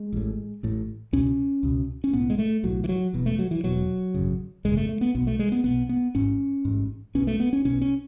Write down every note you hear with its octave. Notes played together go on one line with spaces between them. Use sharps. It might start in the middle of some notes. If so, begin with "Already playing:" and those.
Already playing: G#3
A1 A2
A1 A2
C#2 B2 C#4
C#2 B2
C#4
B1 A2 B3
G#3
A3
B1 A2 F#3
E3
F#3
E1 E2 B2
A3
F#3
E3
E1 E2 B2 F#3
G#1 F#2 C#3
G#1 F#2 C#3 G#3
A3
A3
B3
B1 B2 B3
A3
G#3
B3
B1 B2 B3
B3
A1 G#2 C#4
A1 G#2
B1 B2 C#4
A3
B3
C#4
B1 B2 C#4
C#4